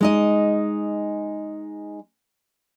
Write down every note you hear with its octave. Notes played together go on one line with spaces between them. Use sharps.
G#3 D#4 D#5